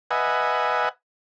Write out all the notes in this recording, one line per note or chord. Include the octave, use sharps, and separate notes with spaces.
B4 D#5 E5 F#5 G#5